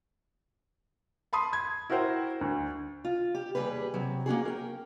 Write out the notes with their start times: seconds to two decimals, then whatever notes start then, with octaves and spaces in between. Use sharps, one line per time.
1.33 A5 B5 C6 D#6
1.53 G#6
1.90 E4 F#4 A#4 C5 G5
2.41 D2
3.05 F4
3.35 G4
3.55 D#2 A#2 G3 G#4 B4
3.94 C3 F#3
4.26 A#3 C#4 F#4 G#4
4.45 A#4 G5